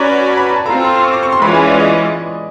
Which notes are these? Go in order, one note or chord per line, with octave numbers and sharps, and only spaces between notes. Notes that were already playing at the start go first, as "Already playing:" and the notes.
Already playing: C#4 F#4 B4 D5 A#5
A5
B5
A#5
A5
C4 F4 A4 A#5
C6
C6
C#6
D6
C#6
C6
E3 G#3 C#4 F4 B5
G#5
D5
D#5